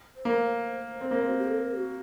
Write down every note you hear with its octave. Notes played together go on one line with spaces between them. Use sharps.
C5
A#3
C5
C4
A#3
C4
F#4
G4
A4
A#4
G4
F#4